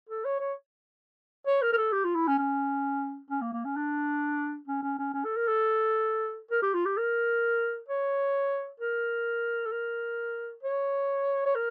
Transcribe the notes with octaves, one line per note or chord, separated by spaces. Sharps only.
A4
C#5
C#5
C#5
A#4
A#4
A4
G4
F4
E4
C#4
C#4
C#4
A#3
A#3
C#4
D4
C#4
C#4
C#4
C#4
A4
A#4
A4
A#4
G4
F4
G4
A#4
C#5
A#4
A4
A#4
C#5
C#5
A#4